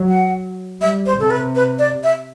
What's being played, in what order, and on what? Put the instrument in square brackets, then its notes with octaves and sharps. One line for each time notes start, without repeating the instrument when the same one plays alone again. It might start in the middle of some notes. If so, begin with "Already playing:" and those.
Already playing: [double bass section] F#3
[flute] F#5
[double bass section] G3 [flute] E5
[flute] C5
[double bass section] C3 [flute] A4
[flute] B4
B4
D5
E5